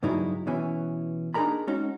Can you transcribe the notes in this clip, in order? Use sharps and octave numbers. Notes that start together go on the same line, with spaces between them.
C#2 G2 F#3 G#3 D#4 E4
B2 E3 C#4
D4 D#4 G#4 A#4 A#5 B5
G#3 C#4 D#4 F#4